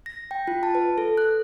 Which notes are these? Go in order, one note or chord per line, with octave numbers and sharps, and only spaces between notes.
A#6
G5
F4
A5
B4
A4
F#6